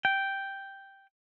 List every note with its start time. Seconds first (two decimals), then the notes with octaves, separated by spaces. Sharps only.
0.05 G5